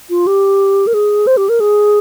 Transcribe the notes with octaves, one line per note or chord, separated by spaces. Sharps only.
F4
G4
A#4
G#4
C5
G4
A#4
G#4